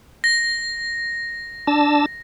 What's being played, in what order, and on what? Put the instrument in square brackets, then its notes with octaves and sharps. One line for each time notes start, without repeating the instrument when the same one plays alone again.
[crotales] A#6
[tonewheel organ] D4 A5 E6